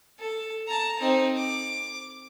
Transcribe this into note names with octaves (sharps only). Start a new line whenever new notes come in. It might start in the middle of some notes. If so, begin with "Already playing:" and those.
A4
A5 A#5
C4 D#4
D6